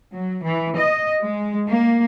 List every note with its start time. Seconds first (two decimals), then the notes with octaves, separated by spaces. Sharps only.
0.13 F#3
0.43 E3
0.78 D#5
1.21 G#3
1.67 A#3